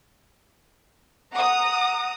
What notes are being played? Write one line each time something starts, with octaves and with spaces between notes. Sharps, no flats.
F#5 A#5 D#6